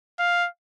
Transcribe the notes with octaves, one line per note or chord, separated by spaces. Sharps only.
F5